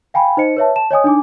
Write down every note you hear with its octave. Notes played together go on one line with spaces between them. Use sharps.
F5 G5 G#5 B5
D#4 C5 D#5 C#7
B4 C#5 E5 A5
A5 E7
C#5 D#5 G#5 D#6
D4 D#4 G#5 D6